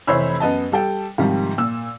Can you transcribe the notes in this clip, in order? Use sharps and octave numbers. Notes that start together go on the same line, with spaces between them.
F1 E3 C5 C#5 B5 E6
F#2 B3 D#5 A5
G3 A4 G5
G#2 C3 D#3 F3 G3
A#2 E6